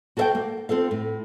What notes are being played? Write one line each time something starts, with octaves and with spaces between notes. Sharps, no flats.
F#4 A4 B4 E5 F5 G5
A#3
C4 F4 A4 F5
A2